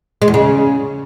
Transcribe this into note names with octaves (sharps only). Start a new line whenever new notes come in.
G#3
E2
C#3